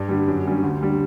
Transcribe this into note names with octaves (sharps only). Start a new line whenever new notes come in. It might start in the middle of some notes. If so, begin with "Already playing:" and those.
Already playing: G2
D3 G3
F#2
D3 G3 C#4
D2
D3 G3